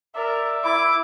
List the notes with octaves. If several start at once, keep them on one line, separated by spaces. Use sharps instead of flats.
A#4 D5 E5
E4 D6